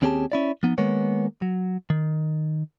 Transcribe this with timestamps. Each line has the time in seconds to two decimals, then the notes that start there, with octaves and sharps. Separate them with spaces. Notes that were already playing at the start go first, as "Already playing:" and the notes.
0.02 D#2 C4 C#4 G4 G#4 A5
0.32 C#4 E4 D5
0.63 F3 B3 D#4
0.78 D#3 G#3 A#3 B3 C#5
1.42 F#3
1.90 D#3